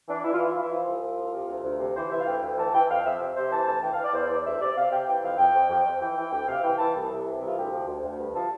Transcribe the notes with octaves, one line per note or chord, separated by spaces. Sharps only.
E3 D4
E3 E4
F4
E3 E4
E3 F4
E4
F3 F4
C2
C2
F3
C3
D2
D2
C3
E3 C5
E3 E5
F5
D2 G5
D2
E3 A5
E3 G5
F2 F5
F2 E5
C3 E5
C3 C5
E3 A5
D2 A5
E3 G5
F5
E3
D5
E2 C5
E3 D5
D2 E5
C3 D5
C3 F5
C3 G5
E3 G5
F2 F5
F2 G5
F2
F2 G5
F2
E3 G5
E3
D2 G5
C3 F5
E3 G5
E3 A5
C2
C3
E3
C2 F4
D2 G4
F3
D2
D2
G2
F3 A5